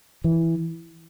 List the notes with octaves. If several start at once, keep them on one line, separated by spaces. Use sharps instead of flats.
E3